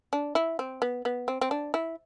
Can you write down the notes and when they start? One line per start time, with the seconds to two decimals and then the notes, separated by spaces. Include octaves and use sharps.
0.13 D4
0.35 E4
0.59 C4
0.82 B3
1.05 B3
1.28 C4
1.41 C4
1.51 D4
1.74 E4